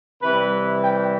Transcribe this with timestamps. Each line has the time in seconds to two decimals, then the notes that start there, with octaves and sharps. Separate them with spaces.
0.22 C3 E3 G3 B4
0.81 G5